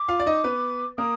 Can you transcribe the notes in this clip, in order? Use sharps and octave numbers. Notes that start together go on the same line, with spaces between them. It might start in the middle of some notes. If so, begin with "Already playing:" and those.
Already playing: D6
F4 F5
D5
D#4 D#5
B3 B4
A#3 A#4 D#6